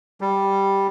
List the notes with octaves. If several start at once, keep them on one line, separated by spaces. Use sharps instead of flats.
G3